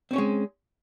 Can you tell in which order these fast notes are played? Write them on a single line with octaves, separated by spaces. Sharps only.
C4 C#4 C#5 G#3